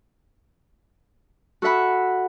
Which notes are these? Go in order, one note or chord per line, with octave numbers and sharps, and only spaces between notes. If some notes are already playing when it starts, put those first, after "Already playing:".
F#4 A4 E5 F#5 B5